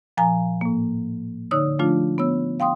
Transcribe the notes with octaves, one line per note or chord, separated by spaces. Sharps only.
A#2 F3 F5 G#5 A#5
A2 A#3
D3 D#4 C#5 D#6 E6
F3 A3 D4 F4
B3 C#5 E6
F5 G5 C6 D#6